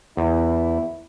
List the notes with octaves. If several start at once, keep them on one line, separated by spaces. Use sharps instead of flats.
E2 E4